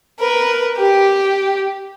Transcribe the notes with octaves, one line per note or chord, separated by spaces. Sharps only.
A#4 B4
G4